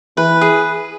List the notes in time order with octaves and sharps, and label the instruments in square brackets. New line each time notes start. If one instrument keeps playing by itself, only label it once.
[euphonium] E3 [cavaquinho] B4
[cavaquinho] G#4